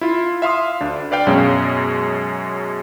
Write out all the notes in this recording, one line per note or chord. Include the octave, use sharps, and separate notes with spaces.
E4 F4
E5 F5 C6 D#6
D2 D4
B4 D5 F5 G5
F#2 B2 G#3 C#4